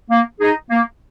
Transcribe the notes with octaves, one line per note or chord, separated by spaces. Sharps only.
A#3
D#4 G#4
A#3